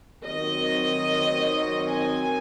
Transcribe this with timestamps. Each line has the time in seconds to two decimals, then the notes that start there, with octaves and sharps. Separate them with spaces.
0.25 D#3 F#3 C4 D#5
1.93 G#5